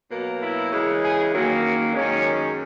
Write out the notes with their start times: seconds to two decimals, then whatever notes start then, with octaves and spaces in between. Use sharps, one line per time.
0.11 B2 F#3 A#3
0.41 E4
0.72 C#3 E3 G#3
1.02 G#4
1.32 F#2 D#3 F#3 A#3 A#4
1.94 F#2 D#3 G#3 C#4